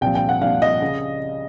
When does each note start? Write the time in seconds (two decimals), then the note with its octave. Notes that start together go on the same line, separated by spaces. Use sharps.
0.01 C2 A#2 F3 G5
0.15 G5
0.29 F#5
0.41 C2 A#2 F3 F5
0.62 D#5
0.81 C#3